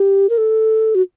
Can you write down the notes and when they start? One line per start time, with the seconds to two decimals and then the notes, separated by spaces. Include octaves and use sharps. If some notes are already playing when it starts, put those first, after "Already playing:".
Already playing: G4
0.30 A#4
0.38 A4
0.95 F#4